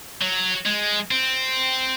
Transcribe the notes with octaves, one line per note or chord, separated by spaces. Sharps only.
F#3
G#3
C4